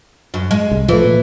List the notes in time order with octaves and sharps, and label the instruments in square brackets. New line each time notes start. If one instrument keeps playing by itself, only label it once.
[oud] F#2
G#3
[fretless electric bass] C2
[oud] E3 [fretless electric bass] F3 A3
[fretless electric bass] A#2